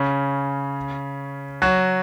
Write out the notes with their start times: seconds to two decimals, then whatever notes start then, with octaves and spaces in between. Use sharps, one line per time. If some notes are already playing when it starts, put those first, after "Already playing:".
Already playing: C#3 C#4
1.62 F#3 F#4